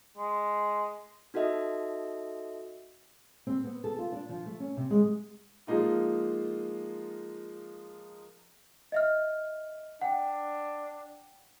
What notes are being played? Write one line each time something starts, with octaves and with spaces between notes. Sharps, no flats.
G#3
D#4 F#4 A4 D#5 E5
C4
B3
A4
F4
D4
F3
A3
C#4
C3
G#3
F3 G#3 A#3 D#4 F4
D#5 E5 F6
D4 F#5 G5